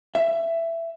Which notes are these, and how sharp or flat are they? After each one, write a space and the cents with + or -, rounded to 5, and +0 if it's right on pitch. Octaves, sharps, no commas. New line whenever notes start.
E5 +15